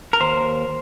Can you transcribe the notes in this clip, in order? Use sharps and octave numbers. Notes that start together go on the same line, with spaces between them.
A#4
D#2 C5